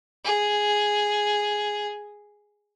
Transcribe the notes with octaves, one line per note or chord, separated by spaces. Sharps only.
G#4